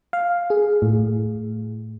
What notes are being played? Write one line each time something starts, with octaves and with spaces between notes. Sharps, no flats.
F5
G#4
A2